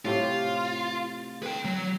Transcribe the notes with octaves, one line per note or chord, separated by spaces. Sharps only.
A2 C3 F4 G4
B4 G5
F#3